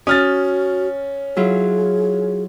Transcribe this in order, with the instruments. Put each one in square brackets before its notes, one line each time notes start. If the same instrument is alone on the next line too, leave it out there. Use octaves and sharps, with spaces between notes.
[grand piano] C#4 F6 A6 [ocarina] F#4 [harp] D#6
[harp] F#3 E4 F4 [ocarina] G#4